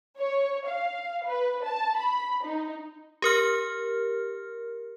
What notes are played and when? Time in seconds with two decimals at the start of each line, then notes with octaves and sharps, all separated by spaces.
0.18 C#5
0.67 F5
1.25 B4
1.64 A5
1.96 B5
2.44 D#4
3.22 G4 A#4 F6